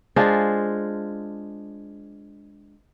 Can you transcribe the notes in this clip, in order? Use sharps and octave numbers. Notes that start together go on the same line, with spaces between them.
G#3 D4 F4 C5